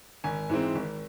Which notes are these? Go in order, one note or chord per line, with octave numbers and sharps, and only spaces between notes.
G#1 G#5
G#2 E3 G#3 C4
G#1